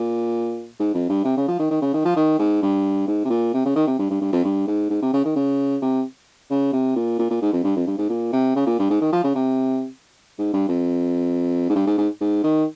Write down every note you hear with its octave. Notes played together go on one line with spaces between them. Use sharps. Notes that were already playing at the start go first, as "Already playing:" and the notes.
Already playing: A#2
G#2
F2
G2
C3
C#3
F3
D#3
D#3
C#3
D#3
F3
D#3
G#2
G2
G#2
C3
A#2
C3
C#3
D#3
C3
G2
G2
G2
F2
G2
G#2
G#2
C3
C#3
D#3
C#3
C3
C#3
C3
A#2
A#2
A#2
G#2
F2
G2
F2
G2
G#2
A#2
C3
C#3
A#2
G2
G#2
D#3
F3
C#3
C3
G#2
G2
F2
G#2
G2
G#2
G#2
G#2
D#3